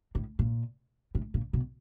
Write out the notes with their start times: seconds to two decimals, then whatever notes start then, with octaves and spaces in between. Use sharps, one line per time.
0.15 A2
0.39 A#2
1.15 A2
1.34 A#2
1.53 B2